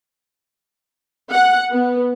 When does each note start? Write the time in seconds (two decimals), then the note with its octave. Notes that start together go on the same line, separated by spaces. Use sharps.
1.31 F#5
1.71 B3